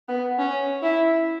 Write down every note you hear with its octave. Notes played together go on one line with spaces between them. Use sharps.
B3
C#4
E4